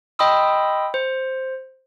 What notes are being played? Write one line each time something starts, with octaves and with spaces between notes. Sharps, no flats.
D#5 G5 B5 C6 D#6 E6
C5